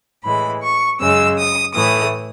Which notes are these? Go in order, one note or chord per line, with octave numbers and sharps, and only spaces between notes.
A2 E3 G#3 B5
C#6
F#2 C#3 G#3 E6
D#6
A2 E3 A3 D#6